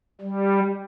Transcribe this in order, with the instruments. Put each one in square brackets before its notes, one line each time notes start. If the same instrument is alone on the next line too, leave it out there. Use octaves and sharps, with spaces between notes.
[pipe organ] G3